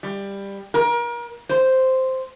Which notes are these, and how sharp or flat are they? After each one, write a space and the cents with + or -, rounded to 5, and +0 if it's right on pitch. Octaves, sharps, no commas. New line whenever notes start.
G3 +15
A#4 +35
C5 -5